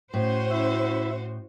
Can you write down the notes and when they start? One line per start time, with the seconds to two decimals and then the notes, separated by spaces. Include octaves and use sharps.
0.14 A2 C#4 F#4 C5
0.51 E4 E5